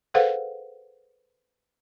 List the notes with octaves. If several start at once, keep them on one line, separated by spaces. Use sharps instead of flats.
G#4 A4 B4 C5 F5 F#5